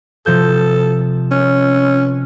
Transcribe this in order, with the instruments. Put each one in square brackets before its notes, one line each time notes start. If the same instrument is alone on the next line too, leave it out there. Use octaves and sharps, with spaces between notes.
[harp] C3 F3 G6 [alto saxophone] A4
[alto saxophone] C#4